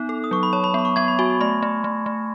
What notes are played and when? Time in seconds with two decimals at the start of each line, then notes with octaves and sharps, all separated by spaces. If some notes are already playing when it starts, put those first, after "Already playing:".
Already playing: B3 D#4
0.09 A4
0.24 D#6
0.31 F#3 C#6
0.43 B5
0.53 C#5 A5
0.64 B5
0.74 B3 B5
0.85 C#6
0.96 B3 G#6
1.08 B5
1.19 F#4 G#5
1.30 B5
1.41 A3 B5
1.63 A3
1.84 A3
2.06 A3